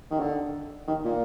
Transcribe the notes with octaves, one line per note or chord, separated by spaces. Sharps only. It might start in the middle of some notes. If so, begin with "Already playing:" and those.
D#3
D3
D#3
A#2